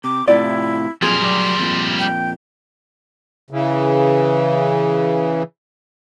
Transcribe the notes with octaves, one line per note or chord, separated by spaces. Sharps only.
C3 D6
A2 C3 E4 F4 D5
F2 A#2 F#3 G3 G#4 A#4 C6
F#3 D5
F2 A#2
G5
C#3 E3